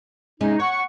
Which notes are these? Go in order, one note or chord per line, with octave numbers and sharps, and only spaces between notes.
C3 G#3 C#4 D#4
C#5 F#5 C#6